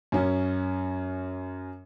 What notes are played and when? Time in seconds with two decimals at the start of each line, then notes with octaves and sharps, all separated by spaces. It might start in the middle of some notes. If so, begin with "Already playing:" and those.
0.12 F#2 C#4